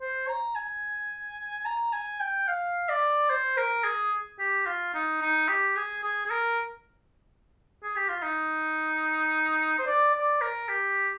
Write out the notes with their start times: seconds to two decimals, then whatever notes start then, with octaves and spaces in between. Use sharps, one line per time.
0.01 C5
0.28 A#5
0.56 G#5
1.65 A#5
1.93 G#5
2.20 G5
2.48 F5
2.89 D5
3.30 C5
3.57 A#4
3.84 G#4
4.39 G4
4.66 F4
4.94 D#4
5.22 D#4
5.49 G4
5.76 G#4
6.04 G#4
6.26 G#4
6.30 A#4
7.83 G#4
7.96 G4
8.09 F4
8.22 D#4
9.79 C5
9.86 D5
10.14 D5
10.41 A#4
10.69 G4